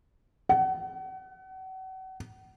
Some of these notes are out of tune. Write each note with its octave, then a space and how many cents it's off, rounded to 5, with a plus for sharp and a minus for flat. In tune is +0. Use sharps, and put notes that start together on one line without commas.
F#5 +35